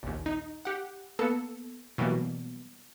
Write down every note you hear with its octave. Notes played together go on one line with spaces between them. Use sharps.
A#1 D#2
D#4
G4 F#5
A#3 B3 A4 E6 C#7
B2 E3 F#3 G3 A#3